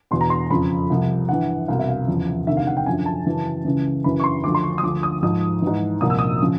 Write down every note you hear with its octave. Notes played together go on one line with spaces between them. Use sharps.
E2 B2 C6
A#5
C6
F2 C#3 F3 B5
C2 C3 F3
G2 E3 F#5
C2 B2 F5
E5
F5
E2 C#3 F3
D2 C3 D#3 E5
F5
F#5
G5
F#2 D3 F3 G#5
A5
F#2 C#3 E3
C#2 C#3 E3
F#2 C#3 E3 B5
C#6
C6
D2 D3 F3 D6
C6
C#6
D#6
D2 D3 F3 D6
D#6
G#2 F3 D#6
G#2 E3
C2 A#2 F3 D#6
E6
D#6
C#3 F3